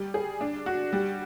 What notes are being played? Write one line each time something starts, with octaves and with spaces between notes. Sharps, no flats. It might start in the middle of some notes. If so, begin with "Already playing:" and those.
Already playing: G3
G#4
D4
F#4
G3